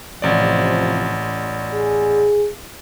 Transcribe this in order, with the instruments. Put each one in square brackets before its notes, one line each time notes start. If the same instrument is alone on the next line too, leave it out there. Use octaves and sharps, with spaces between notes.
[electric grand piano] A1 D5 [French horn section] C3 F3
[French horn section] G#4